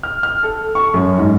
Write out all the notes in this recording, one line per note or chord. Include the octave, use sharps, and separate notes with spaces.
F6
F6
A4
C#6
F#2
G#2